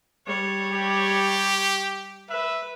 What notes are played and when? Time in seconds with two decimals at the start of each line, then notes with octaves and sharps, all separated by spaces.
0.27 G3 C#5
0.72 G4
2.30 B4 E5